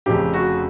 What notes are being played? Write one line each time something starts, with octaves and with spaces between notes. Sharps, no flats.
F1 F2 C#3 G4
F#4